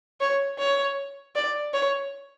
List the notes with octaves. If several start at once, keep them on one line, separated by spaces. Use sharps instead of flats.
C#5
C#5
D5
C#5